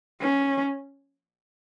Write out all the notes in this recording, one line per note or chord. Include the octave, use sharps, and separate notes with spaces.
C#4